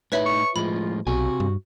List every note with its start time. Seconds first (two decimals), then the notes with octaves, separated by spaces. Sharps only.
0.12 A2 D#4 B4 C#5 E5 B5
0.26 C#6
0.56 A2 F3 G#3 F4 B5
1.07 B1 C3 F#4 G#5
1.40 G2